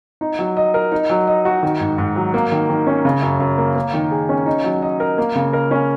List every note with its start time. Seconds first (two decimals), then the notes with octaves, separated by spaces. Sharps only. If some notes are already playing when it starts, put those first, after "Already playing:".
0.21 D#4
0.39 F#3
0.57 D#5
0.74 A#4
0.92 D#4
1.10 F#3
1.27 D#5
1.45 F#4
1.63 D#3
1.80 G#2
1.98 G#2
2.16 F#3
2.34 A#3
2.52 D#3
2.69 D#3
2.87 C#4
3.05 C#3
3.22 F#2
3.40 F#2
3.58 A#3
3.76 A#3
3.94 D#3
4.11 G#4
4.29 C#4
4.46 D#4
4.64 F#3
4.82 D#5
5.00 A#4
5.18 A#3
5.35 C#3
5.53 A#4
5.71 C#4